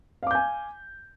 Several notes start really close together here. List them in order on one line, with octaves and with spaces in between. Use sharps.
F5 D6 G6 G#5